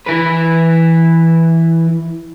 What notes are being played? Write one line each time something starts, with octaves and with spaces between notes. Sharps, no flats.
E3 B4